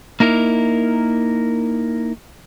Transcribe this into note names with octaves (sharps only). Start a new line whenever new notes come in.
A#3 D#4 E4 A#4